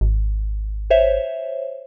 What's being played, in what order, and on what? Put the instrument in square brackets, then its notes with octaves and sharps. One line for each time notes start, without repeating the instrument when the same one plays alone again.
[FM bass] G#1
[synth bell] C5 C#5 E5